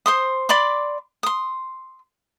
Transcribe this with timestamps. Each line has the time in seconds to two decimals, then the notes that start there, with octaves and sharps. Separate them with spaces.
0.06 C5 C6 D#6
0.49 D5 B5 C6 D6
1.23 C6 D#6